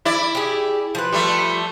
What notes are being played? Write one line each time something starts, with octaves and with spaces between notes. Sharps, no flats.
E4 D5
G4 G#4
F3 B4
G3 A3